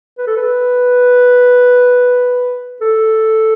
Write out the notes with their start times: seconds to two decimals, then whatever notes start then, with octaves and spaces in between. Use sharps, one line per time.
0.18 B4
0.27 A4
0.37 B4
2.81 A4